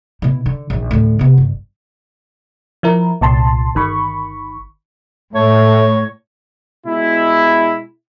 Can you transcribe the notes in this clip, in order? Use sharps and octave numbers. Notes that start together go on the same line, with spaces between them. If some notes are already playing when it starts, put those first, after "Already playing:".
B2 E4
D3
A#1 D#3
D2 A2
C3 B3
G1
F3 E4 A#4
C2 A#2 A5 C6
G1 D#3 B5 C#6
A2 A3 C#5
B2 G#3 E4